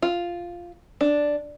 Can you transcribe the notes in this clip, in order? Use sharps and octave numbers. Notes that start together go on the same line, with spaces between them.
F4
D4